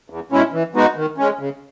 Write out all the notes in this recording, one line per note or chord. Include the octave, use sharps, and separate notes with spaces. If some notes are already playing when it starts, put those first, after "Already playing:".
E2
B2 G#3 C#4 E4
E3
G#3 B3 D#4 F#4
D#3
G#3 C#4
C#3